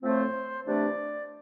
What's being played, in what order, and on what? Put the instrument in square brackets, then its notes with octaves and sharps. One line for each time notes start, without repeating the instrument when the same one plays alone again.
[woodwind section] A2 F3 A3 C4 [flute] C5
[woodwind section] C3 E3 A3 D4 [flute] D5